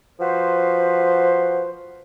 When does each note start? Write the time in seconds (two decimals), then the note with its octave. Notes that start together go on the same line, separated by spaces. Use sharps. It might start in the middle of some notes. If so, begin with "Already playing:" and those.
0.20 F3 F#4 B4 C5